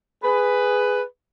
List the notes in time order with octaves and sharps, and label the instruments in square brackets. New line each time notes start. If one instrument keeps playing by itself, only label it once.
[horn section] G#4 B4